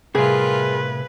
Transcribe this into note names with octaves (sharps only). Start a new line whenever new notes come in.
A2 C3 G3 F4 G#4 A#4 B4